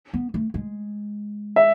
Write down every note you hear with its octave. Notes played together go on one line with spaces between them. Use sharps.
B3
A3
G#3
E5